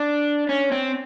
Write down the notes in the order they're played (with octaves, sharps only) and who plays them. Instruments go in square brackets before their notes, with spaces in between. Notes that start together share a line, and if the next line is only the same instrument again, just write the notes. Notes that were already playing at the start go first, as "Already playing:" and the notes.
Already playing: [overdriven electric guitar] D4
C#4
C4